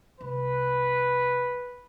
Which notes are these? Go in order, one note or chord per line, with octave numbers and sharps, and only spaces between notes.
C2 B4